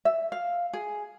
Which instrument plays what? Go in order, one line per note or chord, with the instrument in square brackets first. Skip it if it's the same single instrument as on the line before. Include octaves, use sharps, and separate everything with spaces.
[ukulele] E5
F5
G#4